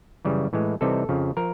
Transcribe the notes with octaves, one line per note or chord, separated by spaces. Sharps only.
F#2 C#3 E3 G3
A2 E3 G#3
C3 E3 G3 C4 D#4 A4
F2 C#3 F3
F3 A#4